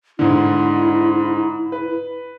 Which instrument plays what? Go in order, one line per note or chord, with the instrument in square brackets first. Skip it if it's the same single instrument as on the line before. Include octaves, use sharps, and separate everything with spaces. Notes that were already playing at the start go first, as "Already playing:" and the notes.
[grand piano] G#2 D3 [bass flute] E4
[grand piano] B4